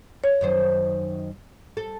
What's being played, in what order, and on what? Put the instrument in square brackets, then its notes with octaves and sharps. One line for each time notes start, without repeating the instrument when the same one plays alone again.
[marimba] C#5
[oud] F#2 D#3 C5
A4